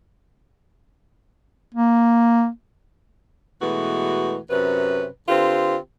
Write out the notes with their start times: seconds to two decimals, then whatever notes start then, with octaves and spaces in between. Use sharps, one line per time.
1.74 A#3
3.62 B2 E3 G#3 A3 F#4
4.50 F#2 C3 C#4 B4
5.29 D3 C4 F4 G4 B4